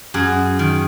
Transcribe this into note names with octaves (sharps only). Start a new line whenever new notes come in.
F#2 G#4
D#3